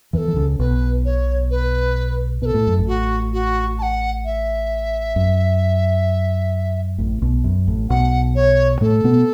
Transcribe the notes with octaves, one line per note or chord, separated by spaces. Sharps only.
E2 E3 A4 B4
E3
C#2 C#3
B1 B2 B4
C#5
B4
B2 A4 B4
A2
F#2
A1 A2
F#4
F#4
A5
F#5
E5
F#2
A1 A2
B1 B2
F#2
A1 A2
B1 B2 F#5
C#5
A2 A3 A4
B2 B3